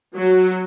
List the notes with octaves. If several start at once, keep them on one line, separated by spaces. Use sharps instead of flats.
F#3